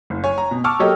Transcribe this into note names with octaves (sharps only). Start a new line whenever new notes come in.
F#1
C#5 G#5
A#5
B2
A5 C#6 D6 E6 F6
F#3 A#3 G4 A4 C#5 D#5